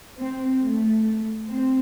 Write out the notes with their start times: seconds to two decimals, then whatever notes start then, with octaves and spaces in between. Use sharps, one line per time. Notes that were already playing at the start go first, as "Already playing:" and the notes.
0.17 C4
0.62 A3
1.51 C4